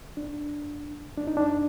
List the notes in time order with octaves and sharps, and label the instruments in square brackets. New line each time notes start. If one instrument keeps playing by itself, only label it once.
[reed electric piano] D4
D4
D#4
D4